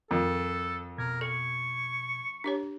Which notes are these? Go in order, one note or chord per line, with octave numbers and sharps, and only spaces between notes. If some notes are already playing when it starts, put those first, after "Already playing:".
F2 D#3 A4
B2 A#4 G#6
A4 C#6
D4 G4 C#5